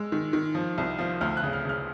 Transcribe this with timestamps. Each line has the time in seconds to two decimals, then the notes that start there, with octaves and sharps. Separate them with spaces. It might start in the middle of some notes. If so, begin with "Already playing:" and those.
Already playing: G#3 E6
0.12 D#3
0.33 D#3
0.55 F3
0.78 C2
0.99 F3
1.21 D2 F6
1.37 F#6
1.43 C#3
1.53 F6
1.65 C#3 F6